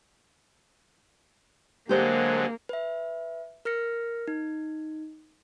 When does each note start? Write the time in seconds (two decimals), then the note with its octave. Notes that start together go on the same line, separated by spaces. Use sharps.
1.89 D3 F#3 G#3 A#3 G4 C5
2.69 B4 E5
3.65 A#4 F6 A#6 C#7
4.28 D#4